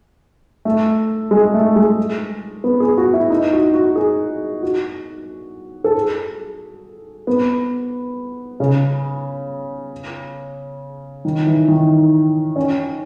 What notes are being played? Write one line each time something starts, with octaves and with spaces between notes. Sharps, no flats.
A3
G#3
A3
G#3
B3
G#4
F#4
E4
D#4
F#4
F#4
G#4
F#4
A4
G#4
B3
C#3
D#3
E3
D#3
C#4